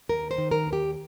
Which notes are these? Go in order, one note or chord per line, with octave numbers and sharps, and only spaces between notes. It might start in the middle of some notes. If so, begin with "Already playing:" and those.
D#2 A#4
C5
D#3
A#4
D#2
G4